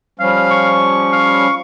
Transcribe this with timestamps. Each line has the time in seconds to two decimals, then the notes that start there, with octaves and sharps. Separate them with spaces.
0.20 F3 G3 C#4 F5
0.50 C#6
1.12 F5